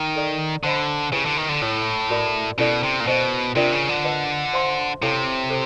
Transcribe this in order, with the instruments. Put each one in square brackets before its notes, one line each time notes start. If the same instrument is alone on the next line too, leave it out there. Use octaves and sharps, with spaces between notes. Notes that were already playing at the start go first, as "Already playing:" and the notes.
Already playing: [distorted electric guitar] D#3
[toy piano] A4 D5 F5 A#5
[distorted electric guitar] D3 [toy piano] C5 D#5 G#5 B5
[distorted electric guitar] C#3 [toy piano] E4 G4 B4 E5 G5
[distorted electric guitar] D3
D#3
D3
[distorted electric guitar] A2 [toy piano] E4 A4 C#5
[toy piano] F#4 A#4 D5
[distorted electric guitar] B2 [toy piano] C#4 E4 A4 D5
[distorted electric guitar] C3
A#2
[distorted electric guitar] B2 [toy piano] C5 D#5 F#5
[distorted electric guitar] C3 [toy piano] D4 F4 A#4 D5 G5
[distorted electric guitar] C#3
D3
[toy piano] B4 D#5 F#5 A5
C5 E5 G#5 C6
[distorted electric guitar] C3 [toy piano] E4 A4 C#5 F5 A5
[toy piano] A4 C5